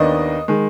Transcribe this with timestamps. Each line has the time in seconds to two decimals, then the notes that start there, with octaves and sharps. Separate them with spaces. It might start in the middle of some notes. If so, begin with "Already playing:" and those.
Already playing: D#2 D#3 B3 D4 D#5
0.48 D#3 G#3